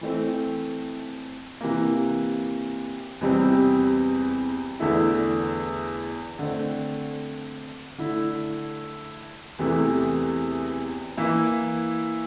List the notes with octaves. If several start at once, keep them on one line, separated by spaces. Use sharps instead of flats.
E3 A3 C4
C3 E3 A#3
E2 C3 G3 C4
E2 D3 A3 E4
D3 A3 C4
D3 A3 E4
E2 C3 E3 A3 E4
E3 A#3 E4